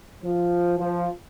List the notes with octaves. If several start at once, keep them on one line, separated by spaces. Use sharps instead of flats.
F3
F3